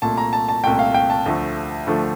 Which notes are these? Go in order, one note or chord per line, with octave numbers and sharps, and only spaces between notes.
C2 A#2 A3 A5
A#5
A5
A5
C2 A#2 A3 G5
F5
G5
A5
D2 D3 F3 A3
D2 D3 F3 A3